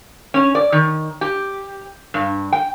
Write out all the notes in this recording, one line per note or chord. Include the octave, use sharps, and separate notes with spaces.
C#4
D5
D#3
G4
G2
G5